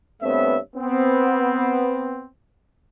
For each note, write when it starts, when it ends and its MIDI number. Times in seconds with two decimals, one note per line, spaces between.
0.22 0.57 43
0.22 0.57 57
0.22 0.57 59
0.22 0.57 60
0.22 0.57 73
0.22 0.57 76
0.75 2.26 59
0.75 2.26 60